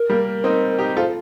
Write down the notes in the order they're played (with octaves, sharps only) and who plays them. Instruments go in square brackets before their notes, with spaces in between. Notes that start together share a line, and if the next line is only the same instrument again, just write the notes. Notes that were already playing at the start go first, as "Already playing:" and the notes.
Already playing: [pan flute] A#4
[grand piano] G3 A#3
C4 D#4
D#4 G4
[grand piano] F4 A4 [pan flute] C5